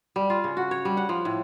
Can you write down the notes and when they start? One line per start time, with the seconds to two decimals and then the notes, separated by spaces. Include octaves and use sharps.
0.16 G3
0.30 F4
0.44 C#3
0.57 F#4
0.71 C#5
0.85 G3
0.97 F#5
1.09 F3
1.25 A2